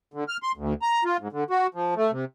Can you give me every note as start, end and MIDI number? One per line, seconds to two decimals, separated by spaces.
0.14 0.24 50
0.28 0.37 89
0.43 0.52 84
0.57 0.74 38
0.82 1.04 82
1.04 1.17 65
1.20 1.28 44
1.32 1.44 50
1.50 1.67 66
1.74 1.94 53
1.96 2.11 57
2.12 2.25 48